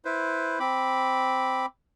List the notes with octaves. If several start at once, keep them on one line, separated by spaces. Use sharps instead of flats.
E4 B4 C5
C4 B5 D6